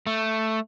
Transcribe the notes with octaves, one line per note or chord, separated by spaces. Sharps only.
A3